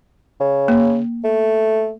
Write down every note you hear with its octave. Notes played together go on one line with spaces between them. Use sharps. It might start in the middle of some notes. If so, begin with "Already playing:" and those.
C#3
A#3
A3